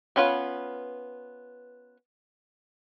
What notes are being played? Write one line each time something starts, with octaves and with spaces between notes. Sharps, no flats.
B3 C#4 D4 F4 B4